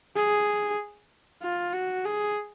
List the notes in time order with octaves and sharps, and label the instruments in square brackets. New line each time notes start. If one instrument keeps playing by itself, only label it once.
[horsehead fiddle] G#4
F4
F#4
G#4